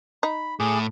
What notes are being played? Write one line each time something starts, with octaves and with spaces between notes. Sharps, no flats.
D#4 B5
A2 G#4 D6